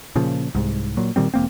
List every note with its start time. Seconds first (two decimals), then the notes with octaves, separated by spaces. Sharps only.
0.16 A#2 C#3 F3
0.55 C2 G#2
0.97 A#2 F#3
1.16 A#2 D#3 G3 C4
1.34 E1 A#3 C4